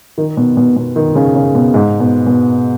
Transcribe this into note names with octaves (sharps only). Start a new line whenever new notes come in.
D#3
B2
B2
B2
D#3
C#3
C#3
B2
G#2
B2
B2